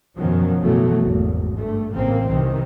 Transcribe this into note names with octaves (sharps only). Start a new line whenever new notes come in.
F#2 B2 D#3 F3 F#3
F#1 B2 E3 F#3 A3
G#1 E2
G2 A3
A1 A#2 C#3 A#3 C4
C2 C3 D#3 E3